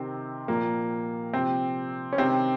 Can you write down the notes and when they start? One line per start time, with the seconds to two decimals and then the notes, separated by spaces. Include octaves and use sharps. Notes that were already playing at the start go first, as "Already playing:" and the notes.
Already playing: C3 D#3 C4
0.48 A#2 F3 A#3
1.33 C3 F3 C4
2.12 C#4
2.18 C3 D#3 C4